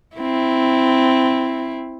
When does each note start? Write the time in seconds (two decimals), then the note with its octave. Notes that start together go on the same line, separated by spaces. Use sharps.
0.17 C4 E4